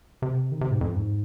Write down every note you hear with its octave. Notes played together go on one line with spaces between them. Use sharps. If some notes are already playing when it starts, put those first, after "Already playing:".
C3
D#3
C3
G#2
F2
G#2